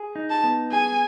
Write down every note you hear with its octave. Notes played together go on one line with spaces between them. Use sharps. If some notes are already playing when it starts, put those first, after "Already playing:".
Already playing: G#4
D#4
A5
B3
G#4 G#5